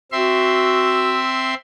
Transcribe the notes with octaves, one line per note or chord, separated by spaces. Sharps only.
C4 F#4 E5 C6